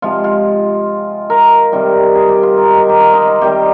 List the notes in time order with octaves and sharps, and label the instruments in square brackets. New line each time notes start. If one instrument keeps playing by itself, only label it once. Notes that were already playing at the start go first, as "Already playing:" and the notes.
[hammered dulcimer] C3 F3 G#3 F4
F4
A#4
C3 D#3 G3
G#4
G4
F4
D#4
A#4
G4
F4
D#4
F4
C3 D#3 G3 G4